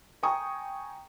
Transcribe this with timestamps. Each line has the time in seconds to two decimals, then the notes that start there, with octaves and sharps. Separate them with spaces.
0.23 G5 G#5 A#5 C#6 D#6